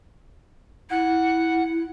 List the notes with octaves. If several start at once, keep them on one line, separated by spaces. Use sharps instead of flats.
E4 F#5